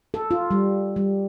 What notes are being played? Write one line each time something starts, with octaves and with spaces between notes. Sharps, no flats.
A4
F4
G3
G3